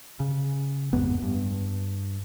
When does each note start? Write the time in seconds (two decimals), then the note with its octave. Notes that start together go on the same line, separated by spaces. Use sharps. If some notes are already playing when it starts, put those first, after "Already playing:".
0.20 C#3
0.93 A1 F2 G#2 B3
1.23 G2